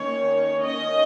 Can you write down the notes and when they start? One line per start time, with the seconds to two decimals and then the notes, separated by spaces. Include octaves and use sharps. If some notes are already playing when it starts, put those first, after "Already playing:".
Already playing: D#3 A#3 C#4 C#5
0.62 D#3 C#4 D#5